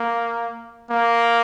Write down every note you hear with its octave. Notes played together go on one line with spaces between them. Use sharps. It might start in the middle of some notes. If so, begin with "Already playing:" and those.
Already playing: A#3
A#3